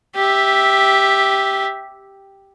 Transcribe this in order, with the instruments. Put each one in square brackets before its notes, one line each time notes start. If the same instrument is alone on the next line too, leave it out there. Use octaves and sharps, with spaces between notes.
[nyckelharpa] G4 E5